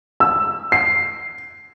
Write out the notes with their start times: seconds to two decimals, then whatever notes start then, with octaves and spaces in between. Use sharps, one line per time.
0.20 E6
0.72 C7